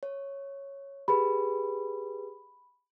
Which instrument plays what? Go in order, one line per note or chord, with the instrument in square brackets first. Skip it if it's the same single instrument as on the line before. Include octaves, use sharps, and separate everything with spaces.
[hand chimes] C#5
[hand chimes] G4 G#4 B4 [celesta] B5